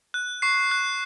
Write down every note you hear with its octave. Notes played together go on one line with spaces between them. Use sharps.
F#6
C#6 C7
F#6